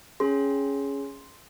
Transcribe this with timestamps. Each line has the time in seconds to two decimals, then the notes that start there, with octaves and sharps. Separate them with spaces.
0.20 C#4 G#4 C6